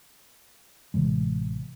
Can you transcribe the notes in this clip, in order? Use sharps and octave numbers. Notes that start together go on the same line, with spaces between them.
A1 C3 E3 G#3